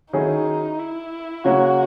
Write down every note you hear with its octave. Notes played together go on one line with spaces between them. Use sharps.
D#3 F#3 C#4 D#4 E4 G#4
E4
C#3 F#3 A#3 C#4 F#4